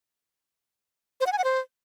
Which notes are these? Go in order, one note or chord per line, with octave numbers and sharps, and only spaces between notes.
C5
F#5
G#5
F#5
C5